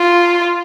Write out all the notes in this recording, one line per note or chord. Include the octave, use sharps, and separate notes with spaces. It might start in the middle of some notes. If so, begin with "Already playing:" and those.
Already playing: F4